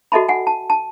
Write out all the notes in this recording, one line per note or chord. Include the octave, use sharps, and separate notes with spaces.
F#4 A4 D#5 E5 A5 B5
F#5 G#5
A5
A5